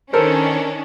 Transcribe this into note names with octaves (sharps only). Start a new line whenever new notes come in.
D#3 C#4 D4 A4 A#4 C5